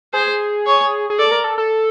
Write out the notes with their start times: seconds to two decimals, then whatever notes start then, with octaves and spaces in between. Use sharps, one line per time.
0.13 G#4 C5
0.66 C#5
1.10 G#4
1.19 A4 D5
1.31 A#4
1.44 A4
1.58 A4